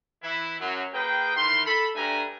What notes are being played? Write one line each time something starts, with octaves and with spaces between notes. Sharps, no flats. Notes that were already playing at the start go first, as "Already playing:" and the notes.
E3 E4
F#2 F#3
A#3 G#4 B4 G5
D#3 E3 B5 C6
A4 B5
G2 A3 D4 G#5 A#5